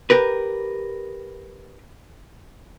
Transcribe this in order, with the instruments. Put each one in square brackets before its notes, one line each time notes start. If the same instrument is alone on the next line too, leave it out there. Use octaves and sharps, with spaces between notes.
[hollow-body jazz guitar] G4 A#4 B4